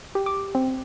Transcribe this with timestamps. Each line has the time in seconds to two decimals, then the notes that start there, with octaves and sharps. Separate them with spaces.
0.15 G4
0.26 D6
0.55 C4